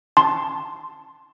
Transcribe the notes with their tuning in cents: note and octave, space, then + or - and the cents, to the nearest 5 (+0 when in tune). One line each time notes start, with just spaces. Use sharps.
A5 +0 C6 +0